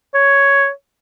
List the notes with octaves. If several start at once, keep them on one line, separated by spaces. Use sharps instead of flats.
C#5